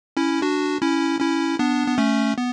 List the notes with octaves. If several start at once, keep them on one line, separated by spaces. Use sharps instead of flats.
C#4 E4
D4 F#4
C#4 E4
C#4 E4
B3 D4
B3
A3 C#4
B3